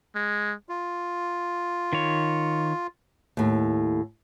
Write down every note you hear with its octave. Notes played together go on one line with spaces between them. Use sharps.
G#3
F4
D#3 C#5
D#2 A2